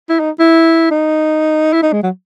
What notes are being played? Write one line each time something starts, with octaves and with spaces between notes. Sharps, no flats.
E4
D#4
E4
D#4
E4
D#4
G#3
F#3